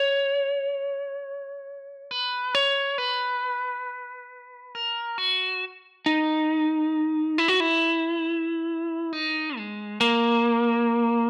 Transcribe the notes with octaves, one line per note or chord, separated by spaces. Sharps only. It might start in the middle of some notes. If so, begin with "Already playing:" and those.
Already playing: C#5
B4
C#5
B4
A#4
F#4
D#4
E4
F#4
E4
D#4
G#3
A#3